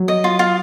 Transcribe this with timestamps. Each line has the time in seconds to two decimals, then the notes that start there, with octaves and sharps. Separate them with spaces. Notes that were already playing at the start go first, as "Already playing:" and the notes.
Already playing: F#3
0.08 D#5
0.24 F4
0.39 F4